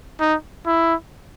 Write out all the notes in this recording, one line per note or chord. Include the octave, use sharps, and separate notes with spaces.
D#4
E4